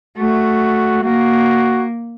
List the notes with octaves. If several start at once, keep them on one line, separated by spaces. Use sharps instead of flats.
A3 F#4
A#3 F#4